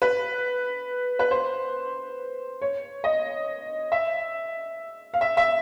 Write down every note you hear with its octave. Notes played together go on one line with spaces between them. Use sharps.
B4
B4
C5
C#5
D#5
E5
F5
E5
E5